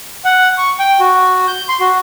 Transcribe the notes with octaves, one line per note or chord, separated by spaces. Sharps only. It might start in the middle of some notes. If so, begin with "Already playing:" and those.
F#5
C#6
G5
F#4
G6
C6
F#4